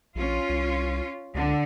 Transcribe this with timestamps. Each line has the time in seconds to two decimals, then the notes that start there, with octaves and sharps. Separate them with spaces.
0.15 A#1 C#4 F4
0.49 C2
1.34 C#2 D3